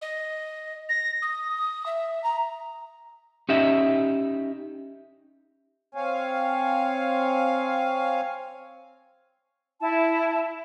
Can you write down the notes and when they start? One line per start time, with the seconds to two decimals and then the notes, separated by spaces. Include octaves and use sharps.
0.02 D#5
0.89 A#6
1.22 D#6
1.86 E5
2.24 A#5
3.49 C#4 D#4 G4 D#5 E5
5.95 C4 C#5 F5 G#5
9.81 E4 A5